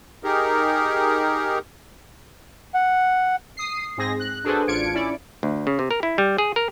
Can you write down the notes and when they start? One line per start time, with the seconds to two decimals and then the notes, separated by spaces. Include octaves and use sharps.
0.24 D#4 G4 G#4 A#4
2.74 F#5
3.57 D#6 C7
3.97 G#2 C4 G#4 A#6
4.19 F#6
4.44 D4 F#4 G#4 A4 B4 C5
4.67 A1 D4 F4 G#6 C#7 D7
4.93 C#4 E4 D5
5.43 D2
5.67 C#3
5.79 C3
5.91 A#4
6.03 E4
6.18 G3
6.38 G#4
6.56 A#4